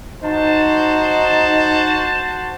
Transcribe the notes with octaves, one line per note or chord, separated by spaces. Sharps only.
D#4 F#4 C5 A5